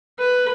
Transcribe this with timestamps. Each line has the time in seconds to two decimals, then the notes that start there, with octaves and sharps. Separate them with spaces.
0.19 B4